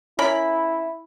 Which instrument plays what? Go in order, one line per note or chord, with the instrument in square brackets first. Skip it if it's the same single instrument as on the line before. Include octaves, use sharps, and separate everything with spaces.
[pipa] C#4 A#4 B5 [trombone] E4